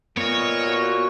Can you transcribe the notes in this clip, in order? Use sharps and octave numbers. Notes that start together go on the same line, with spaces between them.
A#2 B3 C#5 D#5
F#4